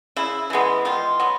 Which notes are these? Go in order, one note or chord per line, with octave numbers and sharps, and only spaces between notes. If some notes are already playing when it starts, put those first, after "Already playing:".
C#3 E4
E3 G#3 B3
D#3 F4
F#3 B3